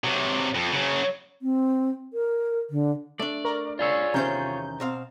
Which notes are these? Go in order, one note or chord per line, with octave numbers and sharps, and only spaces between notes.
C3 F#3
F2
C#3 F#3
C4
A#4
D3
A3 D4 D5
A#4 C#6
F4 G#4 C#5 D5 E6
E2 C3 D#3 C#4 C5 A#5 G6
B2 C4 F5